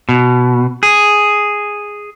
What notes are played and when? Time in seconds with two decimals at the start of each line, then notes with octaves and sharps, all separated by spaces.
0.09 B2
0.83 G#4